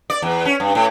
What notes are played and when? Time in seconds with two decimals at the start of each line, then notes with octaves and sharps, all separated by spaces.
0.10 D5
0.22 E2
0.45 C#4
0.60 G2
0.75 A2